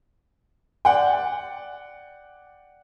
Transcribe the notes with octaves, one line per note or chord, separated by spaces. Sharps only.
D5 F#5 G5